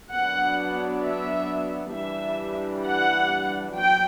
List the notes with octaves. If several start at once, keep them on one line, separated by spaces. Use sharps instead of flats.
F#3 B3 D4 F#5
E5
E3 G3 D4 E5
F#5
F#3 G5